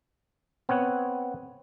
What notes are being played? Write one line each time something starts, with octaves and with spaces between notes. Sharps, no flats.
B3 C4 C#5 F#5